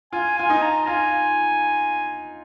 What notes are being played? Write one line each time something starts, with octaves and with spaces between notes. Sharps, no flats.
F4 G#5
F4 G#5
D#4
A#5
F4 G#5